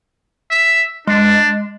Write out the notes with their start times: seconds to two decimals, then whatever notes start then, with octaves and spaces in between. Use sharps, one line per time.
0.51 E5
1.07 G#3 D4